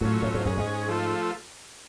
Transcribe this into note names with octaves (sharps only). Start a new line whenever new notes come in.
A2 F#3 A3 C#4 F4
A2
G#2
F#2 G#3 C#4 G#4
G#2
F3 A3 F4 A4